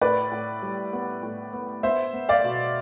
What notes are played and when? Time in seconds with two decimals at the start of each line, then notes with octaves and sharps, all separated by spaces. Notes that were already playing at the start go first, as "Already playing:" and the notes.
0.01 A2 B4 D5
0.32 A2
0.62 G3
0.93 B3
1.23 A2
1.53 B3
1.83 B3 C5 E5
2.13 B3
2.29 D5 F5
2.44 B2